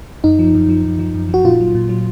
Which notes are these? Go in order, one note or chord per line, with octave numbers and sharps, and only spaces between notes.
F#2 D#4
F3
F#2
F3
F#2
F3
F#2
F3 F#4
A#2 F4
F#3
A#2
F#3